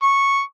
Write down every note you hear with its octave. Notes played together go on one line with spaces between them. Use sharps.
C#6